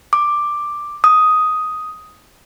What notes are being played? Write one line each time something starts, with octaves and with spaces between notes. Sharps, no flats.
D6
D#6